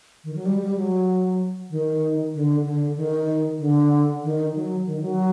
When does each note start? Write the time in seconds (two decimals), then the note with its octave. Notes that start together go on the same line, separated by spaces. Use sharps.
0.24 D#3
0.35 F#3
0.46 G3
0.61 G3
0.76 F#3
1.70 D#3
2.35 D3
2.65 D3
2.97 D#3
3.60 D3
4.24 D#3
4.55 F#3
4.86 D#3
5.01 F#3